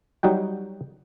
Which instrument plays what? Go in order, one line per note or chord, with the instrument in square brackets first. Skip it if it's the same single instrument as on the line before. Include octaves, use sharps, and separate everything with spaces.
[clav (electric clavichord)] F#3 G3 D#4 F#4 G5